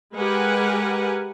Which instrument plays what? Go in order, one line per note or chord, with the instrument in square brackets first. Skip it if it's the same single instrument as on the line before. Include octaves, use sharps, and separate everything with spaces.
[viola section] G#3 G4 A#4 B4 F#5 G#5